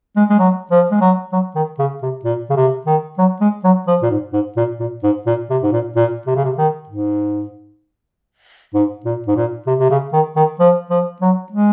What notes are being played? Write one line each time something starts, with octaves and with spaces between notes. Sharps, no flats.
G#3
G#3
F#3
F3
G#3
F#3
F#3
D#3
C#3
C3
A#2
C#3
C3
D#3
F#3
G#3
F#3
F3
A#2
G#2
G#2
A#2
A#2
G#2
A#2
C3
G#2
A#2
A#2
C3
C#3
C3
D#3
G#2
G#2
A#2
G#2
A#2
C3
C3
C#3
D#3
D#3
F3
F3
F#3
G#3